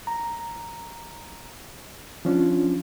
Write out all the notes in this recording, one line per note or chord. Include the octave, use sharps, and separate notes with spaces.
A#5
F3 C#4 D4 F4